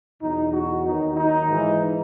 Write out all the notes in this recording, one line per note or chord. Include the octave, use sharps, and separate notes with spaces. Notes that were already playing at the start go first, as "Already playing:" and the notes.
E2 B2 F#3 D#4
F#4
D#2 D#3 F#3 D#4
D#4
G#2 E3